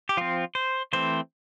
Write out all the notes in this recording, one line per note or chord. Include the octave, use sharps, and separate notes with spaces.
G4
F3 C4 F4
C5
E3 A3 C4 C5